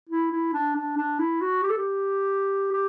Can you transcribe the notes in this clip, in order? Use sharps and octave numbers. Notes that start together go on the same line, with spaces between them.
E4
E4
D4
D4
D4
E4
F#4
G4
A4
G4
G4